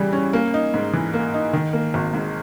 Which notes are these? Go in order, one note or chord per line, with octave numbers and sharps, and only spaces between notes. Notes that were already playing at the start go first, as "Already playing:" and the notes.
Already playing: C#3 E3 G3
C#4
A#3
D#4
G#2
E3
A#3
D#4
D#3
A#3
G#1
G#2